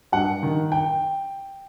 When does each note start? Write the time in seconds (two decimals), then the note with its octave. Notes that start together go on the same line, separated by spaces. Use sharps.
0.12 G2 F#5
0.43 D#3
0.72 G5